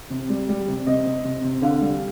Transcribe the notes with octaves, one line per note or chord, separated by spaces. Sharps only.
C3
G3
G3
C3
C3 D#5
C3
C3
C3
D3 F5
G3